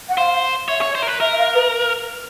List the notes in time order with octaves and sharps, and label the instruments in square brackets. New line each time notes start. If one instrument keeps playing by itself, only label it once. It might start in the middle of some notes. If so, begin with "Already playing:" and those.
[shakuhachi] F#5
[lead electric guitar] C5 [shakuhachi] F5
[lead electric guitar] C#5 [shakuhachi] E5
[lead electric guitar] C#5
C5
A#4
B4
[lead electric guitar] A#4 [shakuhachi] E5
[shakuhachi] E5
F5
B4